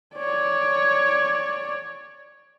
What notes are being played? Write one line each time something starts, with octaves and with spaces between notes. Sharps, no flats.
C#5 D5